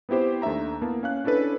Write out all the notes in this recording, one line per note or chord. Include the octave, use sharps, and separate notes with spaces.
B3 C4 E4 G4 C5
D#2 A3 D4 E5 A#5
A#3 B3 E4 A5
C#4 F5 F#6
C#4 D4 E4 A4 B4